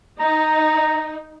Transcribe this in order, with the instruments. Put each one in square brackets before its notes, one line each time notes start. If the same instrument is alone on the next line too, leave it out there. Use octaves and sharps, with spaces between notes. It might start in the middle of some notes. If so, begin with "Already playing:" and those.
[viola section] D#4 [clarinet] A#5